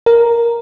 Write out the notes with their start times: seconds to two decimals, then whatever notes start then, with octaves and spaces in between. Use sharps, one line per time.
0.06 A#4